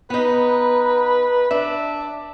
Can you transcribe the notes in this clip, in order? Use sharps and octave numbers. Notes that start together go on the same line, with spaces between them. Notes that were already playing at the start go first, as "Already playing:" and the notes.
B3 D#4 B4
D4 E5